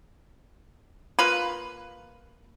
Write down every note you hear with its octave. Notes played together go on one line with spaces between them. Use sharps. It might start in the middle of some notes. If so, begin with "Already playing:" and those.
A#3 F4 B4